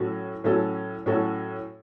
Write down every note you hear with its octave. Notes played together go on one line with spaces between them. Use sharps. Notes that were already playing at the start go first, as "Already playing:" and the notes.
Already playing: A2 F#3 C#4 F#4 A4
A2 F#3 C#4 F#4 A4
A2 F#3 C#4 F#4 A4